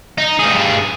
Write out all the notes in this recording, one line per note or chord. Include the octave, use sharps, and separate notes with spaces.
D#4
G2 G#4